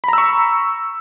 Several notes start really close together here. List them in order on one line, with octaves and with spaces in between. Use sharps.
B5 A#5 E6 C#6